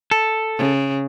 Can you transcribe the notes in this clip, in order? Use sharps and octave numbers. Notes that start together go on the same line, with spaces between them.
A4
C#3